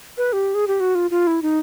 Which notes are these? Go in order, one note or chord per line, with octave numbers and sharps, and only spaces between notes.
B4
G4
G#4
G4
F#4
F4
F4
E4
D#4